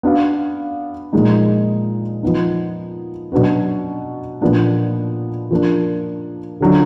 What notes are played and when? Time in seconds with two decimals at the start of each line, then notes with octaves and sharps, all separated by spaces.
0.03 B3 D4 F#4 D5 F5
1.13 A#2 F3 G#3 D#4
2.23 F3 B3 D#4
3.32 B2 F#3 D4 F#4 B4
4.41 A#2 F3 B3 D4
5.51 F3 A#3 D4
6.60 D3 F#3 D4 F4